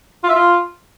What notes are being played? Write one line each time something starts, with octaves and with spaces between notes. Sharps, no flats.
F4
E5
F4